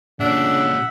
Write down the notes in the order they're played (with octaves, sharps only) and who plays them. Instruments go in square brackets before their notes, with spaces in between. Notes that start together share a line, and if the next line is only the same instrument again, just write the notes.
[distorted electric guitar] A#2 C#4 [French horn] C#3 [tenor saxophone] D4 [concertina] E5 F#5